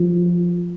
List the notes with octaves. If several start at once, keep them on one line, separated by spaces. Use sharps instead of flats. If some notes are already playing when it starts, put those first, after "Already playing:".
Already playing: F3